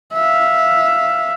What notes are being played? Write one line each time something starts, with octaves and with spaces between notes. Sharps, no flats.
E5 F5